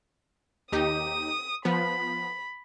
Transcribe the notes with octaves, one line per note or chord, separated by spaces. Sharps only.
D#2 D#4 G4 D#6
F3 B3 B5